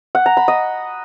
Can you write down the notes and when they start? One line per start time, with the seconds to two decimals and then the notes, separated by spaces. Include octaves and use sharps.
0.15 F#5
0.26 A#5
0.37 B5
0.48 D#5